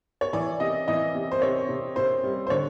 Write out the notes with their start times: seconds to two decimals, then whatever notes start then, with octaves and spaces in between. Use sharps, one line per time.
0.21 C#5
0.33 E3 D5
0.60 C3 D#5
0.88 E3 D#5
1.15 C3
1.31 C5
1.41 C3 C#5
1.69 C3
1.96 C3 C5
2.23 G3
2.47 C5
2.50 D3 C#5